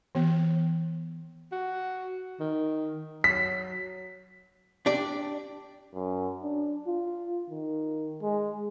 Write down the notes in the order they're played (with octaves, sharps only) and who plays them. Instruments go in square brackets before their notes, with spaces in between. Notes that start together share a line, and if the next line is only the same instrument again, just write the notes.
[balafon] E3 B3
[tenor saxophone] F#4
D#3
[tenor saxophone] F#3 [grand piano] B6
[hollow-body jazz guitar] D4 G4 D5
[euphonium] F#2
D4
F4
D#3
G#3